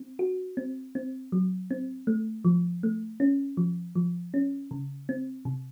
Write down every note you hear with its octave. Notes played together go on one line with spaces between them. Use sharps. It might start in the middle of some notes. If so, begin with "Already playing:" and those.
Already playing: C4
F#4
C4
C4
F#3
C4
A3
F3
A3
C#4
F3
F3
C#4
C#3
C4
C3